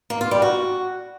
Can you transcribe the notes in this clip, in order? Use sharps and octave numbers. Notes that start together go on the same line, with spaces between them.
A#3
F4
G3
F#4